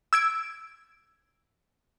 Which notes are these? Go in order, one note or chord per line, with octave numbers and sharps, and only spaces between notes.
E6 G#6 D7